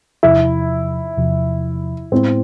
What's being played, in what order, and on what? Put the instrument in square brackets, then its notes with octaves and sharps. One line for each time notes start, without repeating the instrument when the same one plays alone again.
[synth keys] E2 C3 F3 [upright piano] E4
[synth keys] E2 C3 F3
[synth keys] A2 G#3 B3 E4 [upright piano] C4